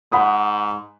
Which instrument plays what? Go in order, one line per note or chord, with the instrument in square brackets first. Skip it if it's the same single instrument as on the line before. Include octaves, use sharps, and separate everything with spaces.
[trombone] G#2 [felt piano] F#5 B5 D#6